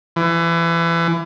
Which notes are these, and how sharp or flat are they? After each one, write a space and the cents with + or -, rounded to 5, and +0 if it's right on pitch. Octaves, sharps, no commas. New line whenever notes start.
E3 +30